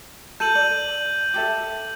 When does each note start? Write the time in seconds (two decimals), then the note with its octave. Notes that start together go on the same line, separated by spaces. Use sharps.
0.40 A4 G6 D#7 F#7
0.55 D5 F#7
1.34 G4 A4 E5